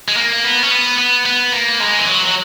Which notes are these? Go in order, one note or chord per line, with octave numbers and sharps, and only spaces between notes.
G#3
A#3
B3
C#4
B3
B3
B3
A#3
G#3
E3
F#3
F#3